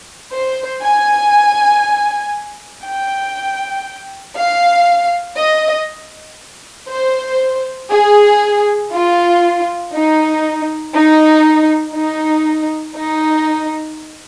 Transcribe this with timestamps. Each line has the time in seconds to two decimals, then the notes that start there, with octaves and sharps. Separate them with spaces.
0.32 C5
0.81 G#5
2.84 G5
4.36 F5
5.37 D#5
6.89 C5
7.90 G#4
8.92 F4
9.93 D#4
10.95 D#4
11.95 D#4
12.97 D#4